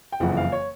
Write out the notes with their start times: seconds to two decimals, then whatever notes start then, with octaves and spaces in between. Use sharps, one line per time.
0.12 G5
0.20 F#1 F2 C#3 E3 F#5
0.37 F5
0.52 C#5